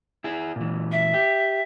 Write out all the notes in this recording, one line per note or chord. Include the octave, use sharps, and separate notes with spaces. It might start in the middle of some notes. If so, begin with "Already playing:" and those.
E4 G#4
A#2 E3
E5
G4